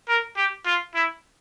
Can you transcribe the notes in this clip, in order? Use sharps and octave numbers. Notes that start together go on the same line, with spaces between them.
A#4
G4
F4
E4